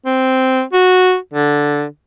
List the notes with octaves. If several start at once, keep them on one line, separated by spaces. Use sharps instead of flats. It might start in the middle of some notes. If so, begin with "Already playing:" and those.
C4
F#4
D3